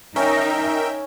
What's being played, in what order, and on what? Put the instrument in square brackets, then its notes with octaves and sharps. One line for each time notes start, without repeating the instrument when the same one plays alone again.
[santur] C#4 [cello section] D#4 [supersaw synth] A#4 E5 G5